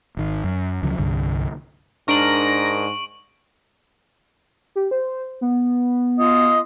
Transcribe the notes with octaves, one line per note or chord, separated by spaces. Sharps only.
G#1 D#3
F#2
D2 C#3 F3 F#3
C2 G2 D3
G#2 D4 A#4 C#6 A#6 D7 F#7
G4
C5
B3
F4 D#5 D#6